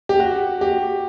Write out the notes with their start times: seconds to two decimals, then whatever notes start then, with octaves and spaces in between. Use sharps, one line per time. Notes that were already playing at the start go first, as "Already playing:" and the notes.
0.09 G4
0.20 F#4
0.61 G4